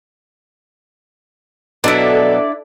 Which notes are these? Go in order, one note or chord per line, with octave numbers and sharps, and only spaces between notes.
B2 F#3 D4 E4 A4 D5